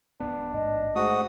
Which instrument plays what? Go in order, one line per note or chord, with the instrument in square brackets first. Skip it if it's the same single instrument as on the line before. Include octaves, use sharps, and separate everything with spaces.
[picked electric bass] D#1 E2 B3 [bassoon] D4
[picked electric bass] A1 G#2 [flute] D#5
[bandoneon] G#2 F#4 D#6 [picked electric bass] A3